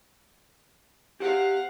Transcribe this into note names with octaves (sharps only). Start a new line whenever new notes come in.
G4 C5 F5 F#5